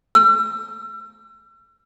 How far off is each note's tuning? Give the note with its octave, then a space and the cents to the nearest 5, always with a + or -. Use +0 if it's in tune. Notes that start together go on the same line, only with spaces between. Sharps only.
E6 +45